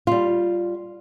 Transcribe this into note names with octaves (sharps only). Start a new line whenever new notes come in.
G3 F4